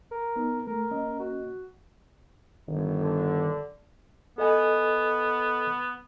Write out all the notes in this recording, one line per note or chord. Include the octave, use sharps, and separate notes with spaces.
A#4
B3 D#4
A3 A#4
A#3 C#4 D#5
F#4
G1 D#3
D3
B3 A4 D#5 G#5